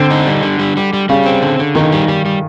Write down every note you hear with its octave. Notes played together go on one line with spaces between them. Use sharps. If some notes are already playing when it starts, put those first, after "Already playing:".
Already playing: D3 C4
D#4
G3
D3
G3
G3
G3
C#3 G3
C4
D3
D3
D#3 D#4
G3
G3
G3